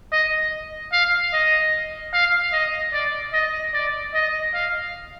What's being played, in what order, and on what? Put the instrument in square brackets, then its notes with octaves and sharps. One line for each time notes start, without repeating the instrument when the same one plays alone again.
[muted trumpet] D#5
F5
D#5
F5
D#5
D5
D#5
D5
D#5
F5